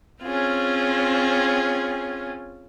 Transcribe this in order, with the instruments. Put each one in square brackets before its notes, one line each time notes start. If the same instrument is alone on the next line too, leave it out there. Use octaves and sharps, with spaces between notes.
[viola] C4 C#4 [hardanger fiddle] F4 G#4